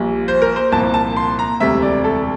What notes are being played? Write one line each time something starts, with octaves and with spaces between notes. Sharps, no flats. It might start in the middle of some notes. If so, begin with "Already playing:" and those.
Already playing: A#1 A#2 G3
C5
A#4
C5
C2 A#2 F3 A5
A5
C6
A#5
E1 D2 C3 G3 E5
D5
A4